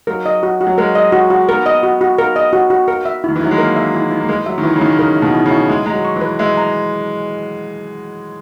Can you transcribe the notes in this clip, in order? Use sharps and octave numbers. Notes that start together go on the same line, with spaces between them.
F#3 A#4
D#5
F#4
F#4
F#3
G#3 A#4
D#5
F#4
F#4
B3 A#4
D#5
F#4
F#4
A#4
D#5
F#4
F#4
A#4
E5
D#3 E4
E3
F#3 E4
G#3
A#3 A#4
E5
E4
E4
A#3
G#3 A#4
F#3 E5
D#3
E3 E4
C#3
D#3 E4
C#3 A#4
E5
B2
E4
C#3
E4
G#3 E5
G#3 A#5
F#3
C#6
E3
B4
G#3 E5
A#5